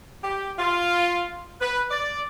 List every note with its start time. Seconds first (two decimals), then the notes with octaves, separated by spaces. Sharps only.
0.24 G4
0.59 F4
1.61 B4
1.91 D5